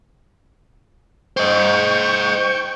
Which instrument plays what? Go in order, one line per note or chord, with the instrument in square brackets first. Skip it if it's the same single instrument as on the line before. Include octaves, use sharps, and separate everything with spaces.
[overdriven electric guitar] C5 D#5 [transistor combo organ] G5 C#6